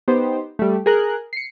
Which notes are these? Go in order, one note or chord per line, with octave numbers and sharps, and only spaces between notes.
B3 D#4 G4 C5
G3 A3
G#4 A#4 F#6
C7 C#7